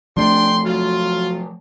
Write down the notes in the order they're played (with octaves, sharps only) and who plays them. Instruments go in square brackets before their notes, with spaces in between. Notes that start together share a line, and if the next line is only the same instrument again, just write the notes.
[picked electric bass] F3 A3 [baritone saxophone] D4 [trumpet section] G5 C6
[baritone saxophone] F#3 [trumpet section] F4